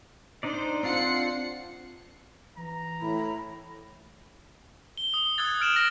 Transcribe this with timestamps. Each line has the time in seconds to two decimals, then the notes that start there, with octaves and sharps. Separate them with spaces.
0.43 D4 D#4 C5 D5
0.83 C4 D4 F4 F#5 C7 C#7
2.57 E3 A#5
3.01 A2 B5
4.97 G7
5.14 D#6
5.38 D#6 E6 F#6 G#6 A6
5.60 F6 D7 E7 F#7
5.76 E6 A#6 D7